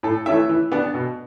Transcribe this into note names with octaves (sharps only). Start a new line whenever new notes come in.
A2 A4
E3 A3 C#4 E4 E5
E3
B3 D4
B2